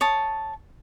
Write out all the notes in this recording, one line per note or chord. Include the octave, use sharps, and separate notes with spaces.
C#5 A5 D#6